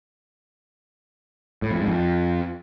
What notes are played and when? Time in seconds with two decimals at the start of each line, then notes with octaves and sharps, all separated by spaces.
1.62 A2
1.71 F2
1.79 G#2
1.87 F2